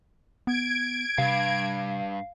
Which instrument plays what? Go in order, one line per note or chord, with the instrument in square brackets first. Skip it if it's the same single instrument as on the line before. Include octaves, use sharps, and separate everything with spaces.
[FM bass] B3 [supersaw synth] G#6 D7
[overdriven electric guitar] G2 [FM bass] C3 [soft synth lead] F5